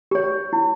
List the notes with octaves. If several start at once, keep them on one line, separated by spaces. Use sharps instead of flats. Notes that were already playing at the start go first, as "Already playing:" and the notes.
G4 C#5
E4